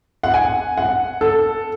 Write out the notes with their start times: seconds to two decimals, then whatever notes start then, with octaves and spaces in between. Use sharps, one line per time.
0.23 F#5
0.34 G#5
0.77 F#5
1.21 A4